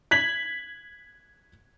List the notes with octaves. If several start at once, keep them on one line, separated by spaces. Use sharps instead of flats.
G#6 B6 F#7